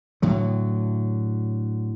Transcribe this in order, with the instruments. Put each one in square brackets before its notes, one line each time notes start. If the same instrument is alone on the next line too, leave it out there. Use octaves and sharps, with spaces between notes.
[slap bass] A2 D3 F#3